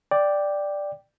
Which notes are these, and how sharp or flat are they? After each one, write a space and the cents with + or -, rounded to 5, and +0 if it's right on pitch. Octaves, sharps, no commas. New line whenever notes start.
D5 +0 G5 +0